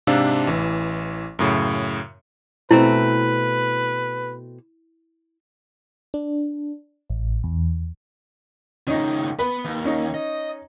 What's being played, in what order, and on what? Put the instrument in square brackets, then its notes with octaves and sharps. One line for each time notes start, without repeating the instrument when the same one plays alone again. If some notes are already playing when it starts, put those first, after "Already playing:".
[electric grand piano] G#2 C3 D4 F5 E6
A1 E3
F#2 A2 C#3
[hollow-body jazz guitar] B2 A3 C4 [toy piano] E4 [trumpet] B4
[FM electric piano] D4
A1
E2
[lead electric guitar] C#2 D#3 [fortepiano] C#4 D#4
[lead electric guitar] B3 [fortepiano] B4
[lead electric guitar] D#2
[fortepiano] C#4 D#4
[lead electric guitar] D#5